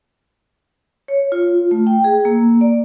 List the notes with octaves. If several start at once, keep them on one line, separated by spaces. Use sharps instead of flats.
C#5
F4
A3
G5
G#4
A#3
D5